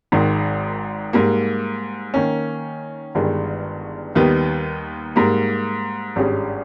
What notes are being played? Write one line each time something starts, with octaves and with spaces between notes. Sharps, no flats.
G#1 G#2 D#3
G#2 G3 A#3
D#3 A#3 C#4
G1 G2 D#3 G#3
D#2 D#3 G3 B3
G#2 G3 A#3
G#1 G2 G3 C#4 G#4